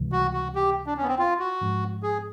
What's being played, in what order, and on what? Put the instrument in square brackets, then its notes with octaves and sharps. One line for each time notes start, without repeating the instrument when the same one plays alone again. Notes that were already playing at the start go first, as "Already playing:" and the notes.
Already playing: [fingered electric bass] C#2 C3 E3 G3
[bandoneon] F#4
F#4
G4
D4
C#4
B3
C4
F4
F#4
[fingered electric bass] G#2 F3 G#3 C#4
[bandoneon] G#4